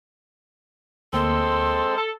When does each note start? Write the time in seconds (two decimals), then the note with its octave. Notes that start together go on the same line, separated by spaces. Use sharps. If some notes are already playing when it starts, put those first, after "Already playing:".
1.13 D2 G#3 A#3 C4 A4 C6
1.97 A4